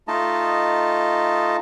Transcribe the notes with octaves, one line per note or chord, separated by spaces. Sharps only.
A3 D#4 F4 D#5 A5